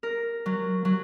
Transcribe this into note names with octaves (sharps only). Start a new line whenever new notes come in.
A#4
F#3
F#3